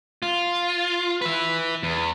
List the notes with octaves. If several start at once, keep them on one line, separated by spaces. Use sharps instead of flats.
F4
B4 E5
E2